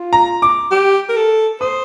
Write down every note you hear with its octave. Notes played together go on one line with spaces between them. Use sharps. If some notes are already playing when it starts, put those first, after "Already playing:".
Already playing: F4
A#5
D6
G4
A#4
A4
C5 D#6